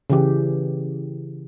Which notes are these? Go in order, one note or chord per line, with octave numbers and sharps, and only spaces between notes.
C#3 E3 G4